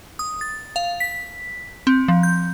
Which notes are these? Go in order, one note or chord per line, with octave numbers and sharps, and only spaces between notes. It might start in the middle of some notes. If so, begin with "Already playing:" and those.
D#6
A6
F5
B6
C4
F3
G6